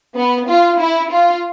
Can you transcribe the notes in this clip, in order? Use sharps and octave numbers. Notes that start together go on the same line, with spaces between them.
B3
F4
E4
F4